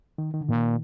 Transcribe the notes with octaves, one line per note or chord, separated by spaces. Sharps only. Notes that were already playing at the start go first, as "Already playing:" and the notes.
D#3
D#3
D3
A#2 D#3